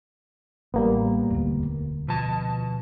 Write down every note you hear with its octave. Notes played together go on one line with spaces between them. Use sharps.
A1 G3 A#3 B3
E1 D2
B2 F3 A5